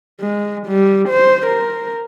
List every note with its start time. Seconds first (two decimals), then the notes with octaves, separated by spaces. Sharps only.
0.21 G#3
0.67 G3
1.09 C5
1.47 A#4